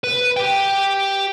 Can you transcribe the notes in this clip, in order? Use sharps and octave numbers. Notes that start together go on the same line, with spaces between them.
B4
G4 G5